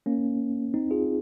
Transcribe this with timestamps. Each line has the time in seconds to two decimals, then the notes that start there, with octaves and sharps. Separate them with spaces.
0.06 A#3 C#4
0.74 C4 D#4
0.91 F4 G#4